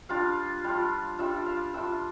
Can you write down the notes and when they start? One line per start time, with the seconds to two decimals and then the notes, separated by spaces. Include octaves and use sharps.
0.09 G3 D4 F4 F5
0.64 G3 D4 F4
1.19 G3 D4 F4 E5
1.46 F5
1.74 G3 D4 F4 E5